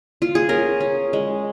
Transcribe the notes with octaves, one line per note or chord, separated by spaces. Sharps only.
F4
G#4
C#4 A#4
C#4
G#3